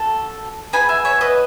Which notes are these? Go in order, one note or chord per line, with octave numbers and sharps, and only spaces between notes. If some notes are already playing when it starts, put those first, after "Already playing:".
Already playing: F#4 A4 A5
B3 D#4 G#4 G#5 B5
E5 G#5
C#5 E5
B4 D#5